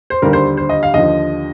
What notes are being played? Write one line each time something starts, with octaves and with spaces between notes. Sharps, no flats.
C5
D#2 D3 G3 A#4
C5
C5
D#5
F5
D#2 D3 F3 D#5